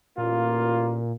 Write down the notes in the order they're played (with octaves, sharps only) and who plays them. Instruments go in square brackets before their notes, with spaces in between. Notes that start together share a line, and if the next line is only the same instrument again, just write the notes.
[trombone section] A1 A#3 F4 [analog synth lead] A#2